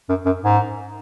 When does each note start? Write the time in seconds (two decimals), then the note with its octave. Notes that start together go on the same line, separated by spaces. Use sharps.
0.09 F#2
0.26 F#2
0.43 G#2